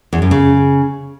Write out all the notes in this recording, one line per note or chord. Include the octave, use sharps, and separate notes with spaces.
E2
F#2
C#3